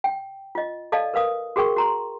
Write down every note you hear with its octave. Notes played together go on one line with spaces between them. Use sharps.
G5
F4 D#5
A4 D5 D#5 F5 A5
A#4 B4 F5 D#6
F#4 G#4 A#4 G5 C#6
F#4 A#5 C6